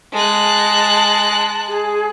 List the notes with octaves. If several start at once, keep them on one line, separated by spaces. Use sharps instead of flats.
G#3 A5 F#6
G#4